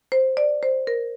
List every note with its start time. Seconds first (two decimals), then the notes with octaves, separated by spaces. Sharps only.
0.12 C5
0.37 D5
0.63 C5
0.87 A#4